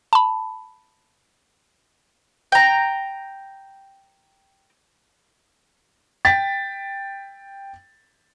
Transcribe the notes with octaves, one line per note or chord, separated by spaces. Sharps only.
A5 B5
G5 A#5
G5 A6 B6